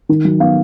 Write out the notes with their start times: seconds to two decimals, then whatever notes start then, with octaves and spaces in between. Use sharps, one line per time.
0.09 D#3
0.25 F#3
0.40 B3 F5